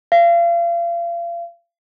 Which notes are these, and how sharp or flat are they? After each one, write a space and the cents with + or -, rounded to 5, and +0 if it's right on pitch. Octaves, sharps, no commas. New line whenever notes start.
F5 -35